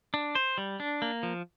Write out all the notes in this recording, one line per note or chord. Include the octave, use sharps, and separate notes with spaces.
D4
C5
G3
D4
A#3
F3